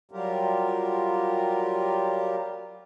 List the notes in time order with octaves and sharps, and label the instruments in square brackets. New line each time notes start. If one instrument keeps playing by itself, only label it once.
[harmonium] F#3 G3 F4 G4 A#4